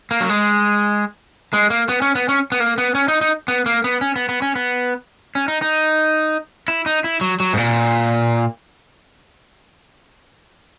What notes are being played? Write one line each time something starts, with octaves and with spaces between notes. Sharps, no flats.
A#3
F#3
G#3
G#3
A#3
B3
C#4
B3
C#4
B3
A#3
B3
C#4
D#4
D#4
B3
A#3
B3
C#4
B3
B3
C#4
B3
C#4
D#4
D#4
E4
D#4
E4
F#3
F#3
G#2
A#2